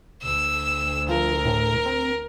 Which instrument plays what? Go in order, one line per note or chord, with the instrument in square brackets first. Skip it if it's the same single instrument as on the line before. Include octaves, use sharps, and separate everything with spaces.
[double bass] D2 [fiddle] E6
[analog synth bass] F3 [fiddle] A#4
[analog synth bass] A2
C4